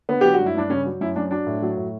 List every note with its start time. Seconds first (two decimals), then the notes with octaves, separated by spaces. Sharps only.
0.09 D3 B3
0.21 F#3 G4
0.34 F#4
0.40 G2
0.46 E4
0.55 G2 D4
0.70 C#3 C#4
0.86 F#3
1.01 F#2 E4
1.16 F#2 D4
1.31 F#3 D4
1.46 A2
1.62 F#3
1.77 A2